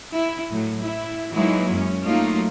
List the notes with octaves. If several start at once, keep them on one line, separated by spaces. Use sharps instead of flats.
E4
A2 F#3
E4
E3 F#3 G#3 A#3 D#4 E4
F#2 C#4
F#3 A3 A#3 D#4 F4